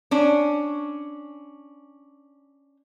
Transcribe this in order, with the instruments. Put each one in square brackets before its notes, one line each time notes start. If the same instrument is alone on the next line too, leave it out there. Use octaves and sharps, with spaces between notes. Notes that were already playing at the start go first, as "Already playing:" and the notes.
[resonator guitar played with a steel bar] C#4 D4